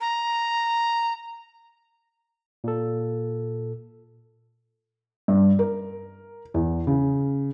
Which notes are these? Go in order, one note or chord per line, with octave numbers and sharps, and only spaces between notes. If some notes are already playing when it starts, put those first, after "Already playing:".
A#5
A#2 A4
G2
A#4
E2
C#3